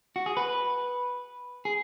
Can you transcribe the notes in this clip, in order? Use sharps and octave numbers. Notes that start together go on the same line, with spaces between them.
F#4
G#4
B4
G#4